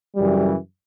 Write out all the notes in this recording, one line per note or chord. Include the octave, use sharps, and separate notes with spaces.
F#2 C#3 E3 G3